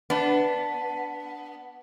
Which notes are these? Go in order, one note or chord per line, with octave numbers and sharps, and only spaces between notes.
B3 D4